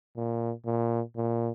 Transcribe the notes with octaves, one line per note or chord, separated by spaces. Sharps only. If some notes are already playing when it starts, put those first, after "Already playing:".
A#2
A#2
A#2